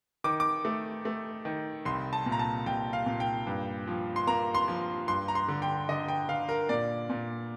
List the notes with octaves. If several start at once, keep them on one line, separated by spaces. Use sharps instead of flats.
D#3 D6
D6
A3
A3
D#3
C2 C6
A5
A#2
A#5
A5
C2 G5
F5
A#2
G5
G2
F3
C6
A#3 A#5
C6
F3
G2 C6
A#5
C6
D3
G5
D3 D#5
G5
D3 F5
A#4
A#2 D5
A#2